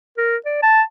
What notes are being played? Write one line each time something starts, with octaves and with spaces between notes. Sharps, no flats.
A#4
D5
A5